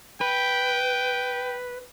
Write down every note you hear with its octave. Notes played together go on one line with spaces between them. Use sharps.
B4 G5